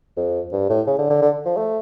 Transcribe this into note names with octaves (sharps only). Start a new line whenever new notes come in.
F2
G2
A2
C#3
D3
D3
D3
F3
A3